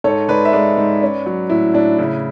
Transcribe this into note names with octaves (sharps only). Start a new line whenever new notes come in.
G#2 A4 C#5
G#2 B4 D5
E5
G#3 B4 D5
G#2
C#4
F#3
A2 E4
A2 D4
C#3 E4